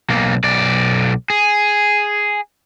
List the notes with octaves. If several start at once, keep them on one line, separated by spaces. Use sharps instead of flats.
B1 A#3
B1 D5
G#4